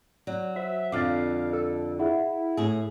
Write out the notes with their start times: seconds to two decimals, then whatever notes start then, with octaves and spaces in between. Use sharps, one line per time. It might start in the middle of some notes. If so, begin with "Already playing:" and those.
0.27 F#3 D5
0.56 F#4 C5 E5
0.92 F2 D3 F5 D6 F6 A6
1.53 A4
1.99 E4 G#4 E5 F#5
2.57 A2 G#4